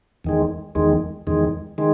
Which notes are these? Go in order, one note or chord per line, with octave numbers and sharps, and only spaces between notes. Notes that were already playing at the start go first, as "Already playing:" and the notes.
E2 D#3 G#3
E2 D#3 G#3
E2 D#3 G#3
D#3 G#3